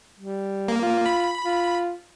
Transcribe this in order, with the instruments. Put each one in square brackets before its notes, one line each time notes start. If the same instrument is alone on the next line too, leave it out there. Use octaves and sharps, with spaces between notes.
[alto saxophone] G3
[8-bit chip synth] A#3
[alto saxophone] F4
[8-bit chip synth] B5
[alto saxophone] F4